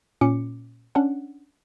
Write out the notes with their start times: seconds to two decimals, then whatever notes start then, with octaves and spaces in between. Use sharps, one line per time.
0.21 A#2 C#4 D6 C#7
0.95 C#4 D4 F#5